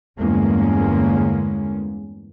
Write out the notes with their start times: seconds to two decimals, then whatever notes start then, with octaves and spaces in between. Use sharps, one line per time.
0.19 E2 G2 D3 G#3 A#3 C#4